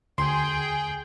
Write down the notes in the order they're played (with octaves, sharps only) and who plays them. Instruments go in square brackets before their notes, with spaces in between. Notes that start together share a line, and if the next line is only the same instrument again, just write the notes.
[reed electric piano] D2 [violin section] G#4 G5 [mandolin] C6